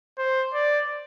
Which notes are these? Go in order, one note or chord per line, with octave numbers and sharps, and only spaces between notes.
C5
D5